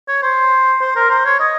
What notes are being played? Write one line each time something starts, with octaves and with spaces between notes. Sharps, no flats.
C#5
C5
C5
A#4
C5
C#5
D#5